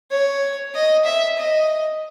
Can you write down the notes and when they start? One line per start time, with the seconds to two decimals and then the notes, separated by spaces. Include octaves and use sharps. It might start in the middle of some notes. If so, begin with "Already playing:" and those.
0.11 C#5
0.75 D#5
1.05 E5
1.38 D#5